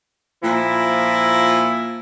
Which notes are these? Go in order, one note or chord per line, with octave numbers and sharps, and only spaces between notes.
A#2 F3 E4